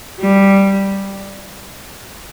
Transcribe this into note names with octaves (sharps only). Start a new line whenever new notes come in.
G3